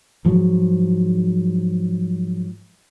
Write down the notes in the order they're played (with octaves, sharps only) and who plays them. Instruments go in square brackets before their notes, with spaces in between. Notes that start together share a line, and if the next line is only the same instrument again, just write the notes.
[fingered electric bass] G#2 F3 F#3